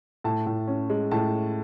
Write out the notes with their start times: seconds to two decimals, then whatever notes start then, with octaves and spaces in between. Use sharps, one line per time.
0.24 A2 A5
0.47 A2
0.68 C#4
0.90 G#3
1.11 A2 A5